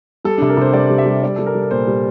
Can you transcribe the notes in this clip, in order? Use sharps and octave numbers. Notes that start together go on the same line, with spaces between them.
G3 A4
D4
C3
A#4
C3 C5
G3 D5
G3
E5
G3
G3 D5
G3 A4
A#4
G3
A#4
A#2 C5
G3